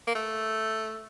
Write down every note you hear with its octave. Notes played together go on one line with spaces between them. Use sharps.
A#3
A3